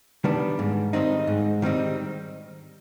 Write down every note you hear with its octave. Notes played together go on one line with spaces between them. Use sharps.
D#3 G3 B3 D4
G#2
D#3 G3 C4 D#4
G#2
D#3 G3 C4 D#4